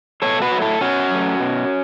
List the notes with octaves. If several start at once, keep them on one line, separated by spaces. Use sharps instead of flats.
B2 A4 C#5
F#4 B4
F#3 A3
E4 A4
B2 C#4 F#4
F#3 A3
B2